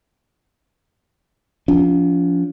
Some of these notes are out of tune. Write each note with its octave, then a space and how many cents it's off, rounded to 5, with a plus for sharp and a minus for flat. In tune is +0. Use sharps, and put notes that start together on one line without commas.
F3 +0 C#4 +45